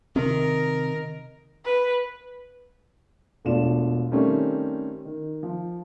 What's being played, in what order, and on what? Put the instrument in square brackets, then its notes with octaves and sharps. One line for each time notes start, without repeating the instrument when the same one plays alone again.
[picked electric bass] C3 C4 [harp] D#3 [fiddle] A#4
[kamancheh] B4
[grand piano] E1 B2 A3 D4 F4 E7
D#3 G3 A3 C4 C#4
D#3
F3